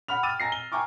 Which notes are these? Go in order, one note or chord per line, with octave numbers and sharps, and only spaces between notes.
F#5 B5 F6 F7
G5 D6 E6 F6 A6 D#7
G#5 A#5 A#6 C7
G7
G5 G#5 A#5 C#6 D6 F6